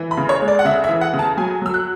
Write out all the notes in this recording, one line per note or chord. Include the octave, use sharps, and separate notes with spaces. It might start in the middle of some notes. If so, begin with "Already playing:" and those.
Already playing: E3
B5
C#3
C#5
G#3
D5
F#5
C#3 E5
E5
E3
F#5
C#3
A5
F#3 G#5
F#3 E6
F#6